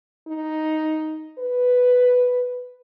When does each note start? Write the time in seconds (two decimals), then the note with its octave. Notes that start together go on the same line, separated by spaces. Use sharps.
0.28 D#4
1.39 B4